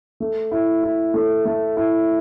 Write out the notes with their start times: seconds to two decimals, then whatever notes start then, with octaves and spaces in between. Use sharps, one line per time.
0.20 A3
0.51 E4
0.83 E4
1.14 A3
1.45 A3
1.77 E4